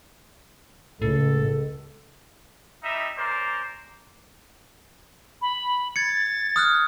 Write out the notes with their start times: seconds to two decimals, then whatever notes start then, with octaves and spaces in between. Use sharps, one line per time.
1.02 C#2 A2 A4
2.83 G3 D#4 E5
3.17 C#4 A#4 C5 D5
5.42 B5
5.96 G#6 A6 C#7
6.56 D#6 F6 F#6